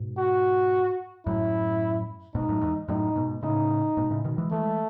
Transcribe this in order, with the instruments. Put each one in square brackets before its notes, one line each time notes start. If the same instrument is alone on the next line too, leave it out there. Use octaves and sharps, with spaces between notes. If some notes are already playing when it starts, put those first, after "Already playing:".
Already playing: [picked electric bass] G#2 B2
[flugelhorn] F#4
[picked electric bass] F#2 A2 [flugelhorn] E4
[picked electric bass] G#2 B2 [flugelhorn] D#4
[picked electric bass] F#2 A2
E2 G#2
[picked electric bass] F#2 A2 [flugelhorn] D#4
[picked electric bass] G#2 B2
[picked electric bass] A2 C#3 [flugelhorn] D#4
[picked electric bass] G#2 B2
A2 C#3
B2 D#3
E3 G#3
[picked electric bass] E3 G#3 [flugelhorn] A3